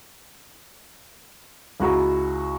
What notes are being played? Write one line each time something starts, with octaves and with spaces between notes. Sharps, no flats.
C#2 E4 F#4 G#4 A#5